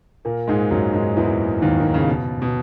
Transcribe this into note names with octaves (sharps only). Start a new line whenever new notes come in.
A#2 A#3
G#2 G#3
F#2 F#3
G#2 G#3
E2 E3
D#2 D#3
D#3
C#3
B2
B2